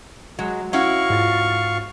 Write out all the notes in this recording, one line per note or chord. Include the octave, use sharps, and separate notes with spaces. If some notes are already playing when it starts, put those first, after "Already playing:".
F#3 G#3
C#4 E4 F#4 F5 C#6
G#2 F4 A6